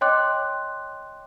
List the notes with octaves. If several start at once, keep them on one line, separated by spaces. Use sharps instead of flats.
C#5 D#5 G5 C6 D6 F#6